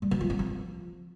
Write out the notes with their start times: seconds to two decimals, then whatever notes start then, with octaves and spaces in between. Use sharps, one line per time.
0.02 G3
0.11 F#3
0.21 F4
0.30 C4
0.39 F3